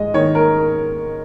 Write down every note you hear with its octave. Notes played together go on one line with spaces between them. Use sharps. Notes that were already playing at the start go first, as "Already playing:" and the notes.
Already playing: G#2 G#3 D#5
D#3 C#5
A#4